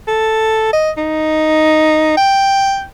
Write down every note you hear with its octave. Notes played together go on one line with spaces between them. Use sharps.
A4
D#5
D#4
G5